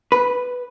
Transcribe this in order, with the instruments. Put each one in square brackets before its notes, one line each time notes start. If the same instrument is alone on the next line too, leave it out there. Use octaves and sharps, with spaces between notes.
[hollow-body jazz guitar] B4